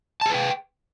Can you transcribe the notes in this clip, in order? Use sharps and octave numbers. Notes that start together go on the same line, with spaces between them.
G#4 B4 G5 A5